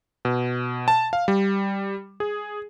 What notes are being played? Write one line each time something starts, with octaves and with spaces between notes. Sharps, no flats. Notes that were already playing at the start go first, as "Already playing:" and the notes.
B2
A5
F5
G3
G#4